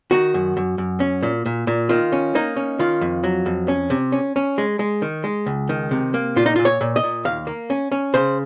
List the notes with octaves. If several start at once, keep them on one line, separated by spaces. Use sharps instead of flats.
D#3 F#4
F#2
F#2
F#2
C#4
A#2
A#2
A#2
D#3 F4
C#4
A#3 D#4
C#4
D#3 F4
F2
F#3
F2
C#4
C3
C#4
C#4
G#3
G#3
D#3
G#3
C#2
D#3
C3
A#3
A#2 F4
D#4
A#2 F4
C#5
A#2
D#5
A#2
D#2 F5
A#3
C#4
C#4
C#3 C5